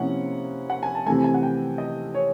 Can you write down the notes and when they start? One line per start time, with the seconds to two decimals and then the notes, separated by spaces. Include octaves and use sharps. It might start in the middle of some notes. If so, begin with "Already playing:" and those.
Already playing: C3 F3 A#3 C#4 E4 F#5
0.70 F#5
0.83 G#5
0.95 A5
1.06 C3 E3 A3 G#5
1.24 G#5
1.34 F#5
1.43 G5
1.78 D#5
2.14 C#5